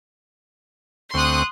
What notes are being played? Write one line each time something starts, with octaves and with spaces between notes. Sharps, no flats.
D2 C4 C6 C#6 D#6 F#6